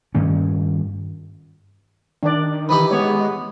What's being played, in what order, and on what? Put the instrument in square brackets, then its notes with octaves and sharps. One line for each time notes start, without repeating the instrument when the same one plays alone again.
[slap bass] G2 D#3 C#4
[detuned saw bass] D#3 [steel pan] D4 D5
[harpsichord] E3 D#4 G4 [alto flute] B5
[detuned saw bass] G#3 [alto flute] B3 [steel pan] C#5